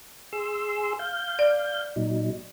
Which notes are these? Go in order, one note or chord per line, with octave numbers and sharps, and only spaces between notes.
G#4 C6 E6
F5 G6
D5
A#2 F#3 D#4